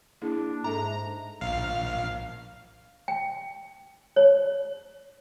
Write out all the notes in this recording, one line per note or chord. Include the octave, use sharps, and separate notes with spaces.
A#3 D4 E4 G#4
G#2 G#3 A4 E5 A#5
A#1 F5
G5
C#5